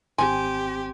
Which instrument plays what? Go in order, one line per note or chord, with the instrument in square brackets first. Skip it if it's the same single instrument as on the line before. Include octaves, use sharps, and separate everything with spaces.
[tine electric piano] G#1 C4 [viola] G4 [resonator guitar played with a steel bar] G#5 [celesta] C6